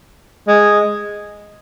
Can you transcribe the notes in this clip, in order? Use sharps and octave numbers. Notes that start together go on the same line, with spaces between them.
G#3